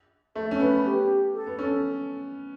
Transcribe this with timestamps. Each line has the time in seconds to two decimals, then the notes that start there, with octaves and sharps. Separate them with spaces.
0.35 A3 A4
0.51 C#4
0.60 B3 B4
0.85 G4
1.34 A4
1.46 B3
1.59 C#4